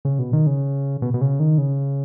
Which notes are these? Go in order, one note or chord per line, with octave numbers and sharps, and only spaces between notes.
C#3
B2
D#3
C#3
B2
B2
C#3
D#3
C#3